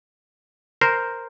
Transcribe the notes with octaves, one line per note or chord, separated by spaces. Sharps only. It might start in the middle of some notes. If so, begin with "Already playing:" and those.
A#4 C5